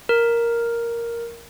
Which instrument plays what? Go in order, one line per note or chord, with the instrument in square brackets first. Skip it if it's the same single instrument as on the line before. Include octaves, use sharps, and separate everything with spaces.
[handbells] A#4